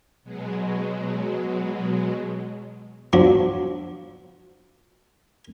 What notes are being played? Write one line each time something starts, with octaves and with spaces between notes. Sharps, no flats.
B2 F#3 G#3
F3 F#3 D4